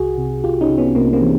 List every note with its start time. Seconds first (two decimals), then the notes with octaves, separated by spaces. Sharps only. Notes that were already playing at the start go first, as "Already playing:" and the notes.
Already playing: C2 F#4 G#4
0.18 C3
0.44 C2 F4 G4
0.61 C#4 D#4
0.70 C3
0.78 B3 C#4
0.95 C2 A#3 C4
1.13 A#3 C4
1.21 E3